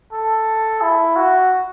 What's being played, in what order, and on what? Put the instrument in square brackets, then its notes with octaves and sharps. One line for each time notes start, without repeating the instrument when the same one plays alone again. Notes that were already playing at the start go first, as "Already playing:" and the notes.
[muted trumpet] A4
E4
F#4